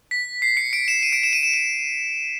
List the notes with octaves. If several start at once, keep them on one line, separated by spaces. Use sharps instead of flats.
B6
C7
C#7
D7
E7
D#7
D7
E7
D#7
E7
D#7